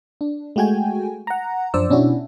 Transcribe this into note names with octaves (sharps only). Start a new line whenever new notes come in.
D4
G#3 A3 F#4 G5 G#5
F#5 A#5
F#2 F3 D4 C5 D5 E6
B2 C#4 D4 E4 F#4